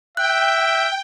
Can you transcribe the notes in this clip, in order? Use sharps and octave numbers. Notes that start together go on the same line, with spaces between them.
E5 G5 F#6